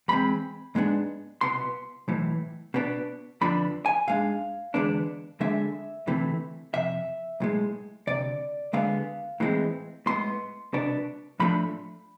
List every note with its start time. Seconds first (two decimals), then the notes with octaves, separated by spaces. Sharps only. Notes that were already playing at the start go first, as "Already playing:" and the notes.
0.08 E2 C3 G#3 C4 B5
0.75 G#2 G#3 B3 D4
1.41 C2 B2 B3 C6
2.08 B1 A2 E3
2.74 B2 B3 D4
3.41 F2 D3 F3 B3 D4 B5
3.86 G#5
4.07 G#2 G#3 D4 F5
4.74 E2 D3 G#3 B3 D4
5.40 D2 D3 G#3 E5
6.07 D2 C3 E3 A3
6.74 F2 C3 E5
7.40 B1 A2 G#3
8.07 D2 C3 D5
8.73 D2 D3 G#3 B3 F5
9.40 A2 E3 G#3 C4
10.06 A2 G#3 B3 C6
10.73 C2 B2 B3 D4
11.40 A2 F3 A3 D4 B5